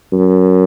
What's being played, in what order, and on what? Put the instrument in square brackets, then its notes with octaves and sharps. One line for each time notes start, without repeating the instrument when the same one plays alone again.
[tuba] F#2